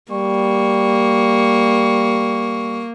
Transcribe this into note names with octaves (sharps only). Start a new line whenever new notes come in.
G3 A#3 C#6